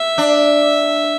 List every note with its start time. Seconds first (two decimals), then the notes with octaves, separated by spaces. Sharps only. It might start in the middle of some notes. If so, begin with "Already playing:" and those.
Already playing: E5
0.18 D4